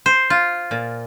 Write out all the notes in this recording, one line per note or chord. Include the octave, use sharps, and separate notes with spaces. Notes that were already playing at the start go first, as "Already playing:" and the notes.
C5
F4
A#2